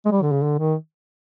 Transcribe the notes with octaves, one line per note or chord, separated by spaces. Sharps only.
G#3
G3
D3
C#3
D3
D#3